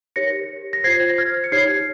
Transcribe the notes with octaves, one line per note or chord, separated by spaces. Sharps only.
D#4 G4 A#4 C#5 A#6 C#7
A#6
F4 C5 G#6 C7
A#6
F6 G#6
C#7
D#4 G4 C#5 G#6 C7